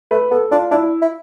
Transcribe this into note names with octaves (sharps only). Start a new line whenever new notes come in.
A3 B4
B3 A4
D4 F4
D4 E4
E4